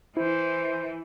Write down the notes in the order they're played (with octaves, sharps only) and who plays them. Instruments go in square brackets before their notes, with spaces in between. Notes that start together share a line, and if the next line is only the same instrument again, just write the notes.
[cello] E3 [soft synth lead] E4 [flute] C5